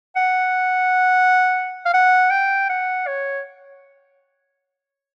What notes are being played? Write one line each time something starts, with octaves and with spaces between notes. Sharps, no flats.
F#5
F5
F#5
G5
F#5
C#5